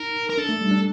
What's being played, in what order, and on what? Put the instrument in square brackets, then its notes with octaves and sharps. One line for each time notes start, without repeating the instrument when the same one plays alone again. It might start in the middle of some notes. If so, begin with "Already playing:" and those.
Already playing: [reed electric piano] D#4 [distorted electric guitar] A#4
[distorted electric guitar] A#4
[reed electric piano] D4 [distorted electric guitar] A4
[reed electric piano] A3
G3
D4